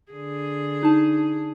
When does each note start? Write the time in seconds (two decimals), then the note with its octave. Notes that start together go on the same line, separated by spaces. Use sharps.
0.12 D3 G#4
0.83 D#4 A5